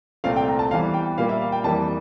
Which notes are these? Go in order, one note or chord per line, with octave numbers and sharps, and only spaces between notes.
C2 A#2 A3 C4 F5
G5
A#5
A5
E2 E3 G3 F5
G5
A#2 G3 A#3 F5
E5
F5
G5
F2 E3 G3 A#3 A5